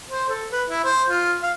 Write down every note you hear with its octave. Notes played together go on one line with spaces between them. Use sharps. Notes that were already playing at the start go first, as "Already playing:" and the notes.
C5
A4
B4
E4
C5
F4
F5